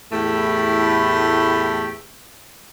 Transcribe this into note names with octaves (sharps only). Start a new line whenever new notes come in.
E2 A2 A3 E4 G4